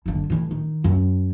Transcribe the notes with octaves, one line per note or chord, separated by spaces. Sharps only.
F#1 D3
A2 E3
D#3
F#2